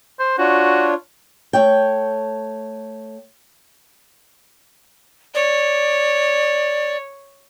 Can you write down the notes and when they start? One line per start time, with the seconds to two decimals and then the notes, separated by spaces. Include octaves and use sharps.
0.19 C5
0.39 D4 F4 F#4 C#5
1.53 A3 C#5 G5
5.35 C#5 D5